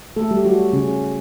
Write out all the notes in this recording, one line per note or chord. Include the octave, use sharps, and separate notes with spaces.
A3 A4
G3 G4
F#3 F#4
C#3 C#4